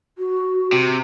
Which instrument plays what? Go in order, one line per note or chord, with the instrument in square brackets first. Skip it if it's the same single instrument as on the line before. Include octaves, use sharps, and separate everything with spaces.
[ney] F#4
[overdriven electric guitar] C3